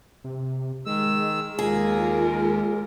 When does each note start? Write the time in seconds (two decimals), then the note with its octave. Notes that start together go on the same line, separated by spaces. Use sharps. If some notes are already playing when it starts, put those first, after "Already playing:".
0.24 C3
0.86 D#3 G#3 E6
1.59 D#2 F4 G#4 A#4